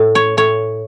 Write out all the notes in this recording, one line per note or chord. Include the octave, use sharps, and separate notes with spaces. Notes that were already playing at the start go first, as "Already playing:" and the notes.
Already playing: A2
C#5
A2 C#5